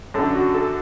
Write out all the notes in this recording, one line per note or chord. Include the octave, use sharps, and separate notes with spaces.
F#2 D3 A4
F#4
A4